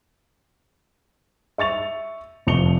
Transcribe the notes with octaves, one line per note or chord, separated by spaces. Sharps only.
E5 C#6 A6 F7
F1 F3 C#6 C#7 F7 G7